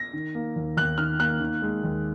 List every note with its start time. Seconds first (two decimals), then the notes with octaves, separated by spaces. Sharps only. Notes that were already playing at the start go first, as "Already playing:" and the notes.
Already playing: A#6
0.13 D#3
0.35 A#3
0.56 D#2
0.77 D#2 F#6
0.98 D#3 F6
1.20 A#3 F#6
1.40 D#3
1.62 G#3
1.84 D#2